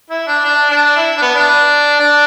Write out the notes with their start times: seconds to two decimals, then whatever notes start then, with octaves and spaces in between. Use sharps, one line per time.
0.10 E4
0.27 D4
0.45 D4
0.70 D4
0.96 E4
1.18 D4
1.22 B3
1.35 D4
1.99 D4